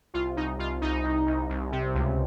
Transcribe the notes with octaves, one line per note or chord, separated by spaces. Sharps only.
C2 F4
C2 D#4
C2 F4
C2 D#4
C2
C2
C2
C3
C#2